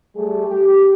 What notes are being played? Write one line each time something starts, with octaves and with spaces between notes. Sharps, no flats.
G3 A3 G#4
G4